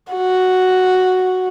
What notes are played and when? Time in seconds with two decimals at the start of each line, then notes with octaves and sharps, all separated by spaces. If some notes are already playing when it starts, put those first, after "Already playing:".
0.13 F#4